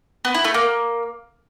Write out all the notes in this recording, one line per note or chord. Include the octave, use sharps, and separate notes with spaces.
B3
E4
A3
A#3